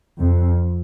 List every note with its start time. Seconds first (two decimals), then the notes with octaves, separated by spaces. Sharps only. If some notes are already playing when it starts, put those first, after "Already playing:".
0.20 F2